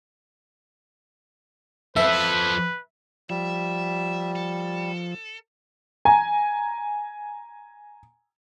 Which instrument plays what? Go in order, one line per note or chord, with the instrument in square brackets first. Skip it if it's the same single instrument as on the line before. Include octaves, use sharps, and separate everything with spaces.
[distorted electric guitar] F3 A4 [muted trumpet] B4 [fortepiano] E5
[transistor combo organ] F3 [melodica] G3 [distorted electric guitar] E5
[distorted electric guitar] A4
[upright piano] G#5 A#5